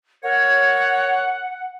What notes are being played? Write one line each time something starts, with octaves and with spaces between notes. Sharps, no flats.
A#4 C#5 F#5